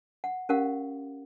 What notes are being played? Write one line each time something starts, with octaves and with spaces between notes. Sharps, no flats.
F#5
C#4 G4 A#4 F5 F#5